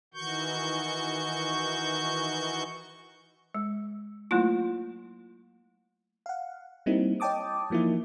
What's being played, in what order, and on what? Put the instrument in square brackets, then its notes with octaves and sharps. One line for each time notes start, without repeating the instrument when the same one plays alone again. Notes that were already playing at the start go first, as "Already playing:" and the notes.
[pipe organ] D#3 E3 F#4 C#6 G6
[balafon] G#3
F#3 A3 A#3 E4 F4
[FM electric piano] F5 F#5
G3 A#3 C4 D#4 E4
C#5 D#5 G5 A5 D6 D#6
E3 F3 A#3 D#4 E4